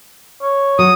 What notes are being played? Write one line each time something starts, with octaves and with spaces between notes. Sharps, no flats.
C#5
F#3 D#6